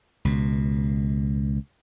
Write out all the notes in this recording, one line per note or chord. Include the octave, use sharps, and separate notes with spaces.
C#2 B2